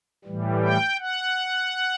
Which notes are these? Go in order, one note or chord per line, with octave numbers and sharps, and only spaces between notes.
A2 E3 G3
G5
F#5